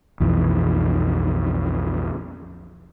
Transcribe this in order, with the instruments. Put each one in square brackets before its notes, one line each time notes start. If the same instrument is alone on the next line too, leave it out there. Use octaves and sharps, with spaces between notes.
[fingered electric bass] B1 F2 E3